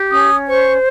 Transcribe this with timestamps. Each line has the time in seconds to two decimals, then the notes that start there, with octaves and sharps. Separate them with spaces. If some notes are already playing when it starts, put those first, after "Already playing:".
Already playing: G4
0.11 C#4 D#6
0.47 C5 C#6